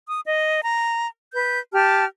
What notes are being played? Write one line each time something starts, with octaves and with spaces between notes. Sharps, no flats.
D#6
D#5
A#5
B4 G6
G4 A5 F6